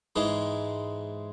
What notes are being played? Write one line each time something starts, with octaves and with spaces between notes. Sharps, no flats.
G#2 E3 G#3